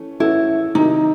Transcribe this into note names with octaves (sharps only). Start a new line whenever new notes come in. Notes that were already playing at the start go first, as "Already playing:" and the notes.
Already playing: E3 A3 C#4
E3 A3 C#4 E4 F#4 A4
C3 D#3 F#3 D#4